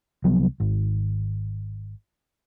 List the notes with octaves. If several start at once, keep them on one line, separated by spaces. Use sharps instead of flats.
C2 F3 F#3 B3
G#1